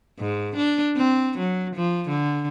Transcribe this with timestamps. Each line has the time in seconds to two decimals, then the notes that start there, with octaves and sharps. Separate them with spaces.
0.20 G#2
0.56 D4
0.97 C4
1.38 F#3
1.75 F3
2.09 D3